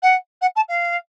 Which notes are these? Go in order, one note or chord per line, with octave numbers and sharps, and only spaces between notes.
F#5
F#5
A5
F5